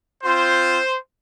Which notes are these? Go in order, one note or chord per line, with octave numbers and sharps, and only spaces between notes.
C4 F4 C5